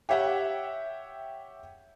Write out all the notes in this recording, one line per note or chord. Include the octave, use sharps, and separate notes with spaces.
G4 C#5 E5 F#5 G5